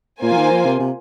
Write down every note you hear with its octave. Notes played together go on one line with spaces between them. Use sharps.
A#2 A#3 F4 C5 G#5
F3
D#3
F3
C3
C3